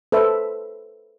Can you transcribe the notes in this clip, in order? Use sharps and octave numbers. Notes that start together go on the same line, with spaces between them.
A4 B4 C5 E5